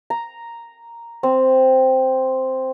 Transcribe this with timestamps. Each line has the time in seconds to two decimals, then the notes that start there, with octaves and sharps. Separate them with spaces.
0.10 A#5
1.23 C4